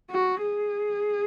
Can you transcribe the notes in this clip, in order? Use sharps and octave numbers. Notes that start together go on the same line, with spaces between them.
F#4
G#4